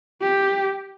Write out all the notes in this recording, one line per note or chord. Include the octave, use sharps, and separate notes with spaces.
G4